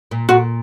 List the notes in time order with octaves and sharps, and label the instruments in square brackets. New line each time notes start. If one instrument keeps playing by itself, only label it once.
[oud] A#2
[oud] A#2 [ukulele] F#4